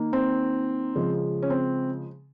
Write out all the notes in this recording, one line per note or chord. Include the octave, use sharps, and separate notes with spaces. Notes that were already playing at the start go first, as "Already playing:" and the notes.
Already playing: D#3 A#3
C4
C#3 F3 G#3
C#4
C4